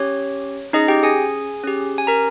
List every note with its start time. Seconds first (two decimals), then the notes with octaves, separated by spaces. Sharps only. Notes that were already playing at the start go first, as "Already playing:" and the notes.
Already playing: C#4 G4 C#5
0.73 C#4 D#4 G#4 D#5
0.88 G4 G5
1.03 G#4 G#5
1.64 C#4 G4
1.98 G#5
2.07 A#4 A#5